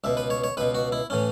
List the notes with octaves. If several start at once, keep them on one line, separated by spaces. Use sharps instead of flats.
C#2 B2 E5
B4
C#5
C#5
C#2 B2 B4
F#4
E4
A2 E3 C#4